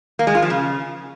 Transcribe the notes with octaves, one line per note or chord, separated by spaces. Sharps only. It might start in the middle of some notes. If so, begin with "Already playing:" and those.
A#3
G#3
F4
F3
C#3